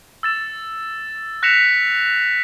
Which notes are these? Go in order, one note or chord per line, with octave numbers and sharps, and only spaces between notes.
E6 A6 E7
F#6 A#6 B6 C#7 E7 F7